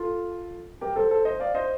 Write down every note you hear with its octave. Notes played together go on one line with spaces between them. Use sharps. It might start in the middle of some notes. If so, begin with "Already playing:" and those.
Already playing: F4 A4
G4 A#4
A4 C5
A4 C5
C5 D#5
D5 F5
C5 D#5